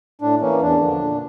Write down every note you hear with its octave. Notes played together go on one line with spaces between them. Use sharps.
A2 D4
E3 A#3 C#4
E2 D4
D3 F3
A#2